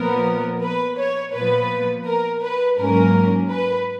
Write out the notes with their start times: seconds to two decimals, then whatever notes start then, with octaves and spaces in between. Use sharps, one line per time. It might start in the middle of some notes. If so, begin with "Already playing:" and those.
Already playing: A#2 F3 B3 A#4
0.63 B4
0.99 C#5
1.34 A#2 F3 B3 B4
2.06 A#4
2.42 B4
2.78 G#2 F#3 A#3 C#4 A#4
3.51 B4